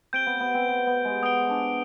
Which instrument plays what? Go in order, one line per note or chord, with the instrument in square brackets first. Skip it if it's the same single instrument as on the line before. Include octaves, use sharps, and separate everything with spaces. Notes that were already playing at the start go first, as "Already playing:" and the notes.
[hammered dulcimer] C4 [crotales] G6 D7 G7
[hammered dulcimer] B3
B3
C4
B3
B3
G#3
[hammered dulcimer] B3 [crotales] D#6 G6 D7 G7
[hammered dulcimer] D4